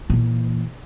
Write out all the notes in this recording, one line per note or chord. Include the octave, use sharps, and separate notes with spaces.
A#2 E3